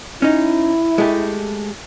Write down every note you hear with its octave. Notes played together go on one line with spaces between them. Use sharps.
C#4 D#4 E4
G#3 A3 G4